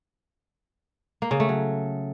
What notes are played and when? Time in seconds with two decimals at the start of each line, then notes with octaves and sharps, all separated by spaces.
1.22 A#3
1.31 C#3
1.40 A3
1.49 F#3